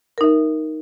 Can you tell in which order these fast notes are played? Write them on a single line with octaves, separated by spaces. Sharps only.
A#4 D#4 E5